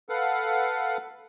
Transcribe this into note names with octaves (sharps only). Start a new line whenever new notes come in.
A4 B4 F5 F#5